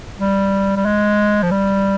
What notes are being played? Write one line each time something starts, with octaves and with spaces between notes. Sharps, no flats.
G3
G3
G#3
F3
G3